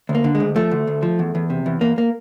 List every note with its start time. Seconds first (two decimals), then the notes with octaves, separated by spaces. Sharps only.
0.09 D2
0.15 A#3
0.24 D3
0.35 G#3
0.40 D2
0.56 F3 A3
0.71 D2
0.87 D2
1.03 F3
1.19 E2
1.35 E2
1.50 C3
1.66 E2
1.81 E2 A#3
1.98 A#3